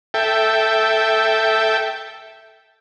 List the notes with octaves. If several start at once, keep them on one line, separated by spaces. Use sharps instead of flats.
A4 E5 G5